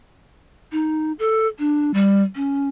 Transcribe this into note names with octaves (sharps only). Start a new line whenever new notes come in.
D#4
A4
D4
G3
C#4